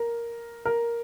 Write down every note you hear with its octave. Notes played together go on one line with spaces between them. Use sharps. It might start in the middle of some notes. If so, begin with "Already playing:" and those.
Already playing: A#4
A#4